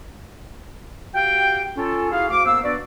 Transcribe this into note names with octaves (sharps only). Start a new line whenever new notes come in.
F#4 G4 F5 G5
C#4 F4 A4
E4 F#4 G#4 F5
D2 F5 D6
F#2 A#3 B3 C5 F5 E6
B3 D4 F#4 B4 D5